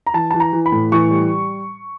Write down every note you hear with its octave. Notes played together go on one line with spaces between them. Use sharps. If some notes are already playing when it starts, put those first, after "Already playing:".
A#5
E3 A5
E3 A5
A#5
E3
B5
A2
E3 C#6
G3